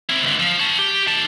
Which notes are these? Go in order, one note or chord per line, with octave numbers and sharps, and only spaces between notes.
C4 E4
C#2 D3
F3
C#5 A5
G4
D#3 A5